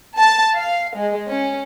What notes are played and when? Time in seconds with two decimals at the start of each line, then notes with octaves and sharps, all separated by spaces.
0.18 A5
0.55 F5
0.97 G#3
1.28 C#4